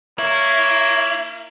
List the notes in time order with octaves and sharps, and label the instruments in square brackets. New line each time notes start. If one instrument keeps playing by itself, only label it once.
[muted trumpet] A#3 [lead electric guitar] E4 [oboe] C#5